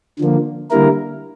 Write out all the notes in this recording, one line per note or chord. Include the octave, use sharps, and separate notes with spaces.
D3 F3 A#3
D3 G3 A#3 E4 A#4